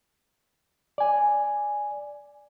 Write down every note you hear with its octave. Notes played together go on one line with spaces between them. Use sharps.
D5 G#5